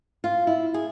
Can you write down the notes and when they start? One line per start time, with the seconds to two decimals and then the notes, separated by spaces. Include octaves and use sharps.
0.24 F4
0.47 E4
0.74 G#4